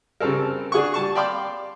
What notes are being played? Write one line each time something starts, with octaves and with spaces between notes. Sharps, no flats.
C#3 G3 C4 A4 A#4
D4 G#4 F#5 C#6
G3 A5 C#6
D5 F5 G5 B5 C6 D6